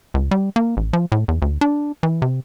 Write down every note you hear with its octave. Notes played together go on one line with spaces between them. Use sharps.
C#2
G3
A#3
A1
F3
A2
E2
D2
D4
E3
C3